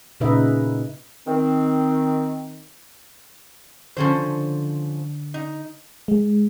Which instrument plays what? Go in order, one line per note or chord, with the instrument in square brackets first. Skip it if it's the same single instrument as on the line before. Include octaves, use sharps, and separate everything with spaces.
[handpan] A#2 C#3 D#4 B4 D#5 E5
[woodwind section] D#3 C4
[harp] D3 [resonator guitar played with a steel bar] F3 C#4 C5
[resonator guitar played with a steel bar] D#4
[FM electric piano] G#3